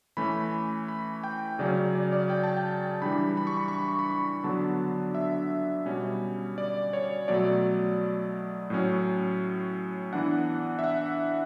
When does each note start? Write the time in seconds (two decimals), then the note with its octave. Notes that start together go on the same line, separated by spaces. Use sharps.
0.17 E3 A3 C#4 B5
0.88 B5
1.24 G5
1.59 C#3 F#3 C#4 D5
1.95 D5
2.13 D5
2.30 G5
2.43 A5
2.57 G5
3.02 E3 G3 D4 B5
3.37 B5
3.47 C#6
3.57 B5
3.68 C#6
3.79 B5
3.88 C#6
3.99 B5
4.43 D3 F#3 B3 D4 A5
5.15 E5
5.85 B2 G3 C#4
6.58 D5
6.93 C#5
7.28 B2 F#3 A3 D5
8.70 A2 F#3 C#4
10.13 E3 B3 D4 F#5
10.79 E5
10.84 F#5